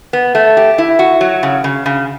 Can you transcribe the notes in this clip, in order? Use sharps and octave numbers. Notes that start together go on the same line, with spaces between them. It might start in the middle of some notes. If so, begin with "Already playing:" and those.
B3
A3
G4
E4
F#4
F#3
C#3
C#3
C#3